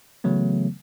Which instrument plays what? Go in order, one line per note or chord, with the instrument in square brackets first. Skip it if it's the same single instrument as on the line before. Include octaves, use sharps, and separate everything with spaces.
[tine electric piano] C#3 E3 F#3 A3 B3